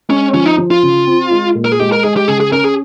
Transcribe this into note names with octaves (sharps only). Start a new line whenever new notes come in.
G#3 C#4
F3 C#4
D#4
F3
F4
C#3
C4
G#3
A#2
A#4
G#4
G#3 G4
A#4
G#3 G#4
G4
C#3 G#4
G#4
C#4 A#4
G#4